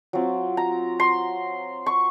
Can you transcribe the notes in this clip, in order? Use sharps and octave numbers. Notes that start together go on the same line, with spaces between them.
F#3 C4 F4
A#5
C6
C#6